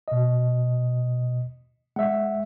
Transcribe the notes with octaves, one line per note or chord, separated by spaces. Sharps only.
B2 D#5
G#3 E5 F#5